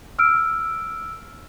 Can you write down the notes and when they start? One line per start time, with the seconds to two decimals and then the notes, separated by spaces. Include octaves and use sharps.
0.19 E6 F6 D7